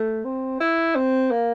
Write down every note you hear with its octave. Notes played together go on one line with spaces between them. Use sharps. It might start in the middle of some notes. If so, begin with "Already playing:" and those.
Already playing: A3
C4
E4
C4
A#3